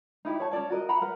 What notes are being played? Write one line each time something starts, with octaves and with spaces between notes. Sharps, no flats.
D#4 E4 G4
C#5 A5
C#4 A4 D5 A5
F#4 A#4 D#5
F#5 A#5 B5
A#4 B4 F#5